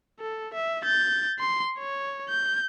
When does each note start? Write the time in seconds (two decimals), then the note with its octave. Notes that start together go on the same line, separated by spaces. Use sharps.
0.21 A4
0.54 E5
0.84 G6 A6
1.39 C6
1.79 C#5
2.29 G6